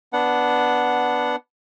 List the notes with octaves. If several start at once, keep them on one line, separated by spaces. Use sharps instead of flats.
B3 D4 F#5